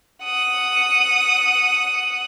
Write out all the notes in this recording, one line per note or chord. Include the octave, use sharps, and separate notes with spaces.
F#5 D#6